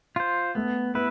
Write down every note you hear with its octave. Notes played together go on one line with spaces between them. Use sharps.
F4 C5
A3 B3
B3 E4 B4